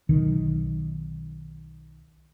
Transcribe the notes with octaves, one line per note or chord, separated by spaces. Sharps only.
B1 D#3